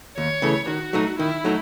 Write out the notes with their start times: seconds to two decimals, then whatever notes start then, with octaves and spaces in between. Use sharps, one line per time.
0.17 D#2 C#5
0.42 C#3 E3 A3
0.68 D#3 F#4
0.93 F#3 A3 D#4
1.19 D#3 E4
1.45 F#3 A3 D#4